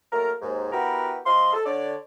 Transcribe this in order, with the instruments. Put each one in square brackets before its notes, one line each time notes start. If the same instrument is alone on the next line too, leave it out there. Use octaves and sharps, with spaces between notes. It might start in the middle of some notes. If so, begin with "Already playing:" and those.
[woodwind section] F#3 A3 A#3 A#4
D#2 G#2
B3 E4 F#4 G4 A#4 B4
F3 D#5 F5 C6
A4
D3 C#5 D5